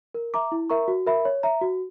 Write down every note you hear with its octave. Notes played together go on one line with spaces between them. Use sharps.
A#4
E5 A#5 D6
E4
A#4 E5 A#5 C#6
F#4
A#4 E5 B5
C#5
E5 A#5
F#4